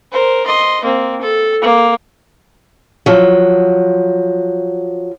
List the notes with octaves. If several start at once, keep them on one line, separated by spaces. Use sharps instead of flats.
A#4 C5
D#5 C6
A#3 C4
A4
A#3
F3 F#3